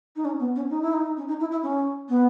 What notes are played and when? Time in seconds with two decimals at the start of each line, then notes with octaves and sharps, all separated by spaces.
0.16 D#4
0.25 C#4
0.39 B3
0.55 C#4
0.70 D#4
0.82 E4
0.93 D#4
1.17 C#4
1.28 D#4
1.40 E4
1.51 E4
1.63 C#4
2.09 B3